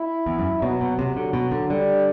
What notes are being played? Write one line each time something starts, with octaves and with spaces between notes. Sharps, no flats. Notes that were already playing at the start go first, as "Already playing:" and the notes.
Already playing: E4
E2
F#2
B2 F#3
B2
C3 F#3
D3
B2
D3
D3 G3